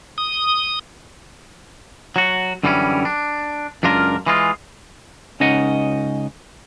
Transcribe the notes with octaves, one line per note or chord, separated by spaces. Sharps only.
D#6
F#3 F#4
F#2 D3 E3 G3 C4 C#4
D4
C#2 F#2 D4 F4 A#4
E3 G#3 F4
C#2 C#4 D#4 D#5 F#5